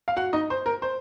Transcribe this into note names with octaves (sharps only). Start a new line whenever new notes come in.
F5
F#4 F#5
D#4 D#5
C5
A#4
C5